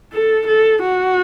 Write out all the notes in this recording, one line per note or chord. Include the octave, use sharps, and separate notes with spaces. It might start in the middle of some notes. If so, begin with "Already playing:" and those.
A4
A4
F#4